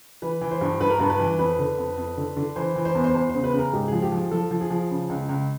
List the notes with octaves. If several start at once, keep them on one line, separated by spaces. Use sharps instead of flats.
E3 B4
E3
C5
G2
G2 B4
A#4
G2 B4
B4
E3
F2 B4
D3
F2
F2
D3
D3
E3 C5
E3
C5
E2
C5
E2 C5
C#3 C5
B4
C#3
A#4
G#2 G4
F3 G#4
G4
F3
G#4
F3 A4
F3
G#4
F3
C#3
C#2
C#2